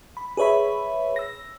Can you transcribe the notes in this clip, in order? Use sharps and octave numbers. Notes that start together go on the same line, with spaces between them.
B5
G#4 B4 C#5 E5 B5
E6 A#6